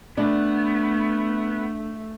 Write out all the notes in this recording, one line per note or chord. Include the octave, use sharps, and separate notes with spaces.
A3 B3 D4